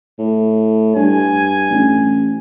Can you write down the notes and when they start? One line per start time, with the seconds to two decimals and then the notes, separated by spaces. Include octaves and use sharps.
0.18 A2
0.96 G2 G#5
1.71 A1